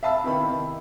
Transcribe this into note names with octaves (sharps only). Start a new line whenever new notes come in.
E5 F5 A5 B5 E6
C3 D#3 B3 E4 G4 B5